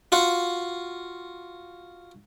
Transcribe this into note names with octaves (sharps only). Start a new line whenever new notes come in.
F4 F#4 F#5